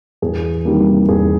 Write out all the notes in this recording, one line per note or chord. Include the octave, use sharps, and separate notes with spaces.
E2 G#4
C3 D#3 G3 A#3
E2 G#4